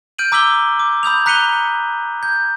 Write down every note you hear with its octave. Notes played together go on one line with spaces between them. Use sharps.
F6 G6 D7 D#7 F#7
A#5 D6 E6 B6 F#7 G7
D6
B5 D#6 G6 F7
A#5 F#6 B6 C#7 D#7 G7
G6